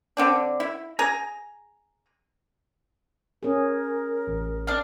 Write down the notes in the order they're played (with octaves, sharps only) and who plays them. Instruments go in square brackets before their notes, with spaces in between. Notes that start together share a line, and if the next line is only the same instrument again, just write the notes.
[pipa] D3 C4 D4
E4
G#4 G#5 A#5
[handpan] C#4 G#4 [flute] A#4
[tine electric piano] A1
[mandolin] D4 F6